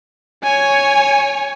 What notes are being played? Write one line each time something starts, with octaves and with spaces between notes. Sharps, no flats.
C#5 G#5